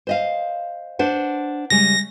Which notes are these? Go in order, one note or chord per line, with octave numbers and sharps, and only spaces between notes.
C5 D#5 F5
D4 C5 F#5
C#3 G3 G#3 A#6